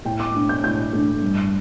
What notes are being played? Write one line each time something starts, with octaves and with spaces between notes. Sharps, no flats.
A2 G5
D6
A3 D4
G6
A2 G6
A3 D4
G2